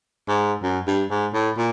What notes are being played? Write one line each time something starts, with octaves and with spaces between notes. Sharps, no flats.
G#2
F#2
G2
G#2
A2
A#2